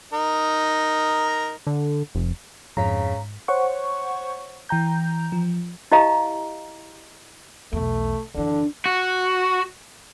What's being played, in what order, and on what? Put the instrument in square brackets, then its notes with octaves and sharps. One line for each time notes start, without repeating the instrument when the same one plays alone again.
[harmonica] D#4 A#4
[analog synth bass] D3
F1
[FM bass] F2 [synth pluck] G#2 B6 [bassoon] C#3 [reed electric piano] A#5
[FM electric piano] C5 C#5 F#5 C#6
E3 G5 A#5 G6
F3
[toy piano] E4 G4 D#5 F5 A#5
[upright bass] B1 E2 [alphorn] A3
[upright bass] F#1 E3 [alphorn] D3 [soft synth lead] D4
[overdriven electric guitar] F#4